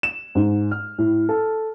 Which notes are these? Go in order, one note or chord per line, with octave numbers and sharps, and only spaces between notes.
E7
G#2
F6
A2
A4